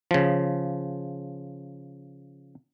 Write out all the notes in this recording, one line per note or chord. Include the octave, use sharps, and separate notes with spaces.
C#3 F3